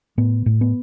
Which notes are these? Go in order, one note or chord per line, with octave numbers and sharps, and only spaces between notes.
A2 B3
A2
B3